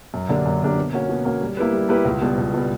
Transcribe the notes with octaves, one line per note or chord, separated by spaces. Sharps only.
F#2
D3 A#3 D4 G4
F#2
D3 A#3 D4 G4
B2
A#3 C#4 F#4
B2
A#3 C#4 F#4
G3
A#3 E4 G4 B4
G3
A#3 E4 G4 B4
C#2
B2 G3
C#2
B2 G3